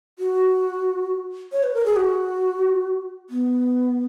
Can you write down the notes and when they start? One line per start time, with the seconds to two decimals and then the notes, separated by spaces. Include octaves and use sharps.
0.19 F#4
1.52 C#5
1.63 B4
1.74 A#4
1.86 G#4
1.96 F#4
3.30 B3